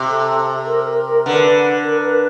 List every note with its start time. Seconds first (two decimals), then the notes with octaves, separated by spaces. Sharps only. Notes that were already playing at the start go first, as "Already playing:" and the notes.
Already playing: C3
0.09 A4
0.66 A#4
0.86 A#4
1.06 A#4
1.26 D3 B4
1.84 A#4
2.04 B4